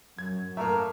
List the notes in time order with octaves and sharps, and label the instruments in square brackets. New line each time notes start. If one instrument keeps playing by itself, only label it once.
[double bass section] F#2 [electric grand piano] G#6
[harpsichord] A2 A#3 [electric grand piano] E5 [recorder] A#5